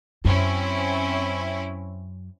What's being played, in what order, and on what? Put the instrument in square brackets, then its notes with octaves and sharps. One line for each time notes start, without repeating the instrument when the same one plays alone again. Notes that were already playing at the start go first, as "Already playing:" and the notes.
[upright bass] F#2 [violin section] C4 C#4 E4